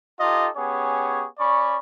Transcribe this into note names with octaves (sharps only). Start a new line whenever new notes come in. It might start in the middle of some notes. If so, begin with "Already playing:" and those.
D#4 F4 G4 A4 D#5
B3 C#4 G4 G#4 C#5
C#4 D5 B5 C#6